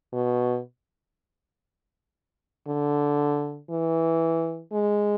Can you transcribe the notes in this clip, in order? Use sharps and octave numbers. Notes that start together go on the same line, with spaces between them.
B2
D3
E3
G#3